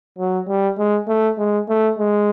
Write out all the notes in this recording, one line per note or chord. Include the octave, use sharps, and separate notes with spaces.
F#3
G3
G#3
A3
G#3
A3
G#3